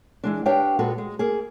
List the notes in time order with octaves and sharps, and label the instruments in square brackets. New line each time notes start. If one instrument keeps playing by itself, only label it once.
[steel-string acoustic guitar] E3 G#3 D4
D4 G4 B4 C#5 F5 G5
A#2 G#3 F#4 A4 B4
G#3
A#3 G#4